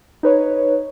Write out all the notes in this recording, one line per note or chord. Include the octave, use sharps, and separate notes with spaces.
D#4 B4 C#5